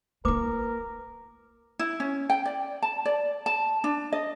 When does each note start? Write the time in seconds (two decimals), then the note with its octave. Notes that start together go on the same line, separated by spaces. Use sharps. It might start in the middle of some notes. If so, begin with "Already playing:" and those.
0.25 A#3 F4 A#4 B4 D6
1.79 E4
2.00 C#4
2.30 G5
2.45 D5
2.82 A5
3.05 D5
3.46 A5
3.84 D4
4.12 D#5